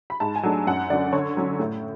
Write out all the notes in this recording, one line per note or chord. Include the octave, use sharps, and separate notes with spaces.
B5
G#2 A5
G#5
F#3 A3 D4
F#2 F#5
D3 F#3 C#4 D5
D3 C#5
F#3 C#4
A2